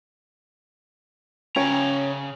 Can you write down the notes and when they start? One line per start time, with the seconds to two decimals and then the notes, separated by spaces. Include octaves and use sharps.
1.56 C#3 C#4 C#5 G5 A#5